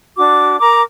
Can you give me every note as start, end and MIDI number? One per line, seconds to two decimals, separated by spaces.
0.17 0.59 62
0.17 0.59 66
0.17 0.59 86
0.59 0.81 70
0.59 0.81 82
0.59 0.81 86